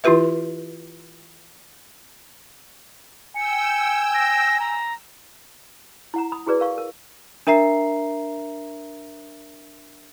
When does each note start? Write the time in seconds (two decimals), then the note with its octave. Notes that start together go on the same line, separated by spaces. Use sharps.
0.04 E3 E4 F4 G4 B4 E5
3.36 G5 G#5 E6 C#7
4.14 A#6
4.60 A#5
6.14 E4 F#5 A#5
6.32 B5 D#6
6.46 E4 F#4 G#4 B4 D5
6.60 A#4 F5 C#6
6.78 A#4
7.47 D4 A#4 E5 A#5 C7